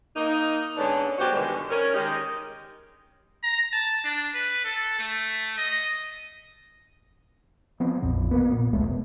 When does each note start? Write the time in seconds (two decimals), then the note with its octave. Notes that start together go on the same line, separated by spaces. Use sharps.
0.16 A#3 D#4
0.77 G#2 D3 B3 C#4 D4
1.19 B2 F#3 F#4 G4 C5
1.33 G2 B2 D3 D#3 G3 G#3
1.70 C#4 A#4
1.94 D#3 G#3 D#4 G4
3.43 A#5
3.73 A5
4.05 D4
4.34 B4
4.64 A4
4.99 A3
5.58 D#5
7.80 F3 B3 C4
8.02 A#1 F2 A#2
8.31 B2 A#3 B3
8.52 A#2
8.73 E1 C2 G#3 A3
8.87 B2